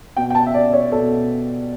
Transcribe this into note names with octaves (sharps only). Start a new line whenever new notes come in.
B2 G5
G5
A5
E5
D5
C#5
B2 A4